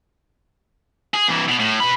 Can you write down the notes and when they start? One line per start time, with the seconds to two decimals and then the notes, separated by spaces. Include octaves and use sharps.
1.14 G#4
1.28 C2 E3
1.48 B2
1.59 A2
1.80 B2 B5